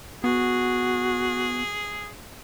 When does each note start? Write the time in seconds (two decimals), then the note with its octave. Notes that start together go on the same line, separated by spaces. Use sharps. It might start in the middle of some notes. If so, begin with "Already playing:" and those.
0.24 B3 F#4 G#4